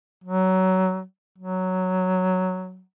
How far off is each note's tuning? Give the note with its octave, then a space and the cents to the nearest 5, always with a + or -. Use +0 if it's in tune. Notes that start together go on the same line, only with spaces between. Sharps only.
F#3 +20
F#3 +0